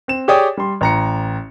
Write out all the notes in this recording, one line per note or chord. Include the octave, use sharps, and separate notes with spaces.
C4 E7
G4 G#4 C#5 D5 G5 D#6
G3 C6
A1 A#5 C#7